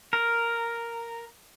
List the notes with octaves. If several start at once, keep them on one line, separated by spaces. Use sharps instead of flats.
A#4